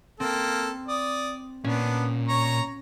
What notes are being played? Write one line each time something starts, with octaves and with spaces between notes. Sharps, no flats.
A#3 C4 A4
D5 D#6
A#2 B3 C#4 D4
C#5 A#5 C#6